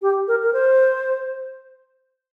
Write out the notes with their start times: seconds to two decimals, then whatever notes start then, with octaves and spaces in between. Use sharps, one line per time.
0.02 G4
0.28 A#4
0.43 A#4
0.53 C5